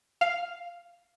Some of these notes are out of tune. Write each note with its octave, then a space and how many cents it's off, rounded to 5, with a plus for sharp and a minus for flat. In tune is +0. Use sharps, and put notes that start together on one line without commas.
F5 +0